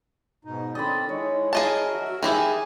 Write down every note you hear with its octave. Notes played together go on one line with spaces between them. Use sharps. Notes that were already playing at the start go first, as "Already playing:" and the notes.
G#2 B2 D#4
D#3 C4 D4 A4 D5 D#5 B5
G#3 D#4 E4 C#5
G#4 A#4 D#5 A5
F#4 E5
D#3 E3 E4 G4 G#4 G#5